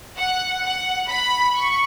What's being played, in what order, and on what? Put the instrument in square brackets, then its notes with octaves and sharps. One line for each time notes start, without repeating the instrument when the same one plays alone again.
[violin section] F#5
F#5
B5
C#6